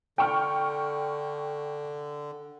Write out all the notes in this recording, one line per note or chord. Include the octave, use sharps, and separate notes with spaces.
D3 G5 C#6 F6